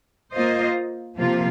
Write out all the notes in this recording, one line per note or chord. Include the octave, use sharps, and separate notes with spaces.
A#3 F4 C5 D#5
C3 F3 A#3 F4